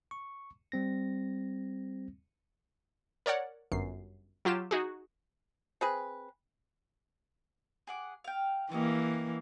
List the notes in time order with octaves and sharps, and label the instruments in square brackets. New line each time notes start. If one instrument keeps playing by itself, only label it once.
[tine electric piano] C#6
G3 C4 A#6
[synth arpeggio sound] A#4 C#5 D5 F#5
G1 F#2 C7
F#3 F4 G4 E7
D#4 F#4 G#4
[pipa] C4 G#4 B4
[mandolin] G#4 F#5 D6
F5 G5
[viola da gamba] E3 A#3 [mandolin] C#4 G4 D#5